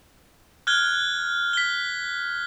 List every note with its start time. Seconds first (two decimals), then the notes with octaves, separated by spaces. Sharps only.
0.67 F6 F#6 G#6 G7
1.53 B6 G7